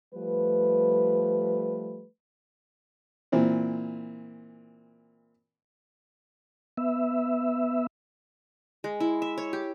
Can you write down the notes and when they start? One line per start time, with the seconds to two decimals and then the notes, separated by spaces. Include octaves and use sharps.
0.14 F3 G3 A3 B4
3.32 A#2 E3 C4
6.78 B3 E5
8.84 G#3
9.00 E4
9.22 E5
9.38 C#5
9.53 G4